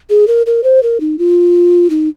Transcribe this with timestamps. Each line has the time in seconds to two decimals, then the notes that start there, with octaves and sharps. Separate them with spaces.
0.10 G#4
0.28 A#4
0.46 A#4
0.64 C5
0.83 A#4
1.00 D#4
1.19 F4
1.90 D#4